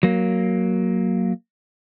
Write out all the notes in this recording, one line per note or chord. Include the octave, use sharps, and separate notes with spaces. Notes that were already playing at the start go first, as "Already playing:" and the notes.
F#3 A#3